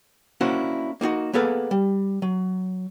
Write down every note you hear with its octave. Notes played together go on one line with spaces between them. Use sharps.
A#3 C#4 D4 E4 F#4 C5
A#3 D#4 F4 F#4
A#3 B3 G#4 A4 B4 F5
G3
F#3